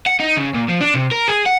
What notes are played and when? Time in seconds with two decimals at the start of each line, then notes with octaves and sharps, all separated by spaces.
0.07 F#5
0.20 D#4
0.37 C#3
0.55 A#2
0.69 F3
0.81 D4
0.94 C3
1.11 A#4
1.28 G#4
1.46 F#5